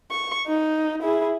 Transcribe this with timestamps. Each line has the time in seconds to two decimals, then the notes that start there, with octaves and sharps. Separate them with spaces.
0.11 C#6
0.47 D#4
1.02 E4 G#4